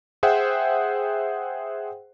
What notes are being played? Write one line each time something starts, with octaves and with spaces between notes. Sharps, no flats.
G#4 C5 E5 F#5 G5